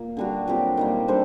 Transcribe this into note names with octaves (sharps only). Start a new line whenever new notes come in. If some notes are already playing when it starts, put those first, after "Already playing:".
Already playing: A#2 A#3
D3 G3 D4 F#4
A#2 F#3 C4 G4
D#3 G3 A#3
G3 D4 A4 C5